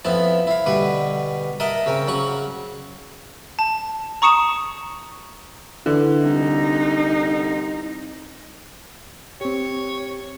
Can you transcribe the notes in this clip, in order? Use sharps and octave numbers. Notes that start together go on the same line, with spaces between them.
F2 F3 B3 E4 A5
E4 F5
B2 D3 G3 B4
A#4 D#5 E5 F#5 A5
C#3 C4 A#4
C#3 F#3 F#5 C#6
A5
A#5 C#6 D#6 C#7 E7
D3 E3
C2 D#4
C4 G4 C#5